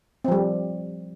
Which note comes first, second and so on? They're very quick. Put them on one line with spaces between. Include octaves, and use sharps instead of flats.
C4 F3 G3